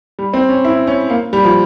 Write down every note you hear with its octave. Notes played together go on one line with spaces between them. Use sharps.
G3
C4
C#4
E4
C#4
A#3
G3
F3